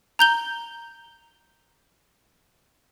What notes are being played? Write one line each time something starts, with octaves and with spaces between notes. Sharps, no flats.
A#5 G6 G7